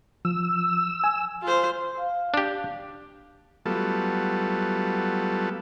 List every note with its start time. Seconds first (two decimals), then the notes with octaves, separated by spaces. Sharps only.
0.25 F3 E6
1.04 G#5
1.42 F4 C5
1.99 F5
2.34 D4 G4
3.66 F#3 G3 A3 B3 F4 A4